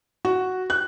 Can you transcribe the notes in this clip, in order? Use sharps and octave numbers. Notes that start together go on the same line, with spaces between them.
F#4
F#6